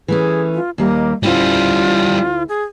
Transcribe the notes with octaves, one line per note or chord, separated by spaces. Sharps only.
E3 A3 C#4 G#4
F4
D#2 G3 A#3 D#5
D2 G3 C#4 E4 F4 C5
G#4